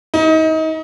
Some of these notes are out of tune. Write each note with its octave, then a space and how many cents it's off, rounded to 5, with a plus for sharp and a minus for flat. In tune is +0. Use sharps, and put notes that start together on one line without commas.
D#4 +30